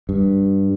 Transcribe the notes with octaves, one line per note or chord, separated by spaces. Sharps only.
G2